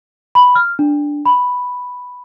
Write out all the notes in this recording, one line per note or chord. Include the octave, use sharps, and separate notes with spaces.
B5
F6
D4
B5